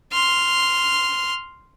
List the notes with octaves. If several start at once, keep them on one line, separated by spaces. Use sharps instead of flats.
C6 F6